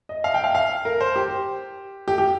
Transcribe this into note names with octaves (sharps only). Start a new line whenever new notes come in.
D#5
F5
G5
F5
F5
A#4
C5
G4
G4
G4